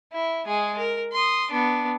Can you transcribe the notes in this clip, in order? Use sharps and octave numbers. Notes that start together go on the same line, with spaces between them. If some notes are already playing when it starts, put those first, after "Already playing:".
E4
G#3 G#4
A#4
C6 D#6
B3 D4